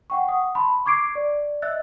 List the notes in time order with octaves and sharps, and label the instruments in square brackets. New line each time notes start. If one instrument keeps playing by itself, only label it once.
[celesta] F#5 G5 C#6
F#5 D#6
A5 B5 C6
C#6 D6 G#6 C7 D7
D5
D#5 E5 E6 F#6 A6